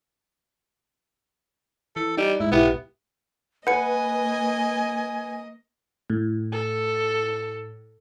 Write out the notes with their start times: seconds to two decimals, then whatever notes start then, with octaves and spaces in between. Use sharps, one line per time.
1.96 E3 A4
2.17 G3 D#4
2.40 G#2 E4
2.52 B1 B3 E4 G4
3.67 A#3 B4 D#5 F#5 G#5 C#7
6.10 A2
6.53 A4